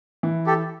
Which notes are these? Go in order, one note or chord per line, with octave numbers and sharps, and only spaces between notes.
E3
G4 A4